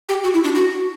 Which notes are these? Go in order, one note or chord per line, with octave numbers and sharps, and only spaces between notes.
G4
F#4
E4
D4
F#4